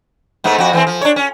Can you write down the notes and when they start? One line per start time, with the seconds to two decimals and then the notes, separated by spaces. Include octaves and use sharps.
0.44 G#2 A3 B3
0.58 F2 F#4
0.73 E3 B3 C4
0.87 F3
1.01 D4 C#5
1.16 C#4